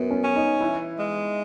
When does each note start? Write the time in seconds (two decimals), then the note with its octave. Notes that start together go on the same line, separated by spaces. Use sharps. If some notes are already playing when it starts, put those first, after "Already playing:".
Already playing: F#2 B3
0.11 C#4
0.23 C#4
0.36 D#4
0.61 E3 E4
0.99 G#3